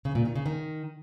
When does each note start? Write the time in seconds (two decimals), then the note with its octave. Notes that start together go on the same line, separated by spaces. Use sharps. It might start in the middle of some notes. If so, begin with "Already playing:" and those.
0.05 C#3
0.15 A#2
0.25 D#3
0.36 C#3
0.46 D#3